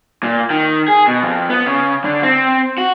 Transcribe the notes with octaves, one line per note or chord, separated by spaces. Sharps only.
A#2
D#3
G#4
B2
F2
B3
C#3
D3
C4
F#4